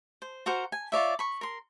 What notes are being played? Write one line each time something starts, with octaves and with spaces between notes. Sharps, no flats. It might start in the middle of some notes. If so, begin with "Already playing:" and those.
C5
F#4 A#4 C5 F#5
G#5
F4 C#5 D5 E5
B5 C#6
A#4 C6